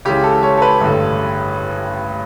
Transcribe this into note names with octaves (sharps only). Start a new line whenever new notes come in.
C#2 C#3 E3 G4
A4
C#5
A4
B4
A1 G2 D3